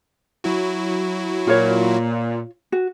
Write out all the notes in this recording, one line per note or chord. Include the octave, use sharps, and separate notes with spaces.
F#3 E4 F#4
A#2 F4 C#5
F#4